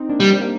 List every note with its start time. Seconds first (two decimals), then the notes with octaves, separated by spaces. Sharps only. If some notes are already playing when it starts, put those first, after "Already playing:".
Already playing: C4 D#4
0.09 A#3 D4
0.20 G3
0.30 C4
0.41 A#3